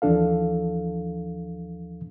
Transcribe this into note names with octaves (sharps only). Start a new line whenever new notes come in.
D#2 E3 F3 D4 A4 F5